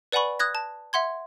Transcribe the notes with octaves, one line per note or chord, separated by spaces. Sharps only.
B4 D5 F#5 G#5 B5 C#6
D#6 F#6 G#6 A#6
A5
E5 F#5 C6 G#6